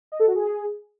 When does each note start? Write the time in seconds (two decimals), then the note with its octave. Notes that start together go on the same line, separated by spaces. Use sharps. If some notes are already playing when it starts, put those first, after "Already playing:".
0.12 D#5
0.20 A4
0.27 F#4
0.35 G#4